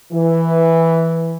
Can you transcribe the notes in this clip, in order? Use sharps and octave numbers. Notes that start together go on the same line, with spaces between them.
E3